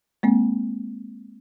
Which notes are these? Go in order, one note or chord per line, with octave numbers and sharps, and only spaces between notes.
G#3 A#3 C4